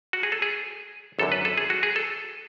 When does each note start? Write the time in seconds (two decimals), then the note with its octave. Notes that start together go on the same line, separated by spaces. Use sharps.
0.13 F#4
0.23 G#4
0.32 A4
0.42 G#4
1.19 G#1 F#2 D3 A4
1.32 B4
1.45 A4
1.57 G#4
1.70 F#4
1.83 G#4
1.96 A4